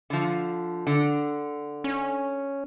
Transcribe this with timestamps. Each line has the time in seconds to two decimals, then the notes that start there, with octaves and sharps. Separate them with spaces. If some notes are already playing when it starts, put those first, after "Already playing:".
0.10 D3 F3
0.87 D3
1.84 C#4